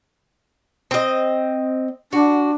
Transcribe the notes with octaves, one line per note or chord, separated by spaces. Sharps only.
C4 D#5
D4 F#4